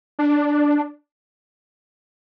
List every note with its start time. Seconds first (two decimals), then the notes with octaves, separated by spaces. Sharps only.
0.19 D4